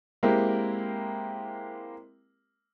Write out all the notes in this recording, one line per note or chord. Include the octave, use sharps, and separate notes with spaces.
G#3 A#3 C4 E4 G4 A#4